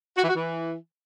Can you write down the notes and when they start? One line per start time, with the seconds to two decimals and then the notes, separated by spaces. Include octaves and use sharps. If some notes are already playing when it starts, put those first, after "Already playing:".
0.17 F#4
0.23 E3
0.29 F#4
0.35 E3